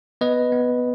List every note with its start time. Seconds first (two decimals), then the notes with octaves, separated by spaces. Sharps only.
0.21 B3 B4 D#5
0.52 B3